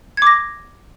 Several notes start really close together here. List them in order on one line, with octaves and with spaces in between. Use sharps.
G#6 D6 A#6